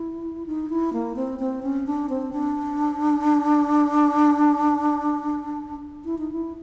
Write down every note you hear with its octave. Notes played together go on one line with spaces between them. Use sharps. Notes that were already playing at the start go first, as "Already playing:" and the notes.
Already playing: E4
D#4
E4
A#3
C4
C4
C#4
D4
C4
D4
E4
D#4
E4